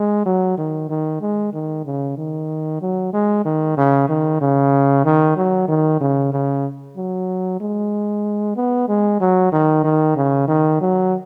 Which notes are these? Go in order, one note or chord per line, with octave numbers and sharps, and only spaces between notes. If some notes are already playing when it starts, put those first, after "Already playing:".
Already playing: G#3
F#3
D#3
D#3
G#3
D#3
C#3
D#3
F#3
G#3
D#3
C#3
D#3
C#3
D#3
F#3
D#3
C#3
C#3
F#3
G#3
B3
G#3
F#3
D#3
D#3
C#3
D#3
F#3